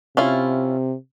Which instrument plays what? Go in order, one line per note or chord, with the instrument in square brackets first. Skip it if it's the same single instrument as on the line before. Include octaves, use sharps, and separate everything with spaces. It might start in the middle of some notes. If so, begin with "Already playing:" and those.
[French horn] C3 [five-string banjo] C#4 E4 F4